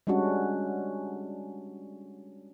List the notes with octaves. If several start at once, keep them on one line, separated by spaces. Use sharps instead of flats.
G3 G#3 C#4 D4 F#4